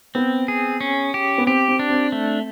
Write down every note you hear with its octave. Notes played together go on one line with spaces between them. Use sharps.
B3 C4
G#4
C#4
G4
B3
C4 G4
C4
D4
C4
A3